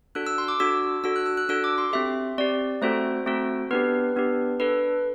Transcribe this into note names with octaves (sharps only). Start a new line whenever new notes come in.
D4 F#4 A4 F#6
E6
C6
D6
D4 F#4 A4 E6
D4 F#4 A4 E6
F#6
E6
F#6
D4 F#4 A4 E6
D6
C6
C4 G4 E5
C4 G4 D5
A3 C4 F#4 A4 C5
A3 C4 F#4 A4
B3 D4 G4 B4
B3 D4 G4
D4 A4 B4